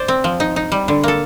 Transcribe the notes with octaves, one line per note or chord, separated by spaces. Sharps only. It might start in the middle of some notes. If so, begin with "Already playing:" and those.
Already playing: C5 D5
C4
F3
D#4
D#4
G3
D3
A#3 A4